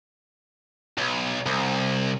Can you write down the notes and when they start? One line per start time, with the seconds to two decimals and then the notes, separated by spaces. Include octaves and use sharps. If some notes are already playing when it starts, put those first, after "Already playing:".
0.98 B1
1.46 C2